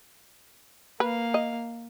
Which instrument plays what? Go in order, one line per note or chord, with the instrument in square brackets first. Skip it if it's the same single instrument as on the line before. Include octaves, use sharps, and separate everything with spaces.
[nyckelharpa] A#3 F5 [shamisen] B4
[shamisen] D#5